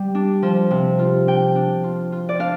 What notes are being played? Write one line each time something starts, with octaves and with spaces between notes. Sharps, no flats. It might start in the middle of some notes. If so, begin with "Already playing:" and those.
Already playing: G3
D4
F3
C3
F4
D4 G5
D4
F4
F4
D5
D4 F5